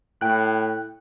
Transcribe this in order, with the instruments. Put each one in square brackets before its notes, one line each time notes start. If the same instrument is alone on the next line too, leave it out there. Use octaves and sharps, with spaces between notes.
[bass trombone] A2 [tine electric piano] G5 F#6